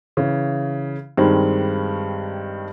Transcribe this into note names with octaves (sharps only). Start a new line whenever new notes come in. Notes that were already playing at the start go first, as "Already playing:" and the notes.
C#3 E3
G2 D#3 G3 G#3 C4